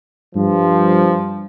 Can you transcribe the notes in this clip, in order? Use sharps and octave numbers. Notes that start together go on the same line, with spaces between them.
G2 F3